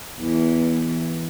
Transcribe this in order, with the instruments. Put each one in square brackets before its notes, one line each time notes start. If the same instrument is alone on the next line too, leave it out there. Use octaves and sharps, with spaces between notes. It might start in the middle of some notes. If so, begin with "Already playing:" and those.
[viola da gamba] E2 E3